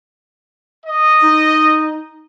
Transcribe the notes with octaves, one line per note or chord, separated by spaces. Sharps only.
D#5
D#4